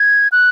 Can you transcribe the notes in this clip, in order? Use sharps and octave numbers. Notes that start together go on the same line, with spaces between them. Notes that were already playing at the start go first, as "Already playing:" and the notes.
Already playing: G#6
F#6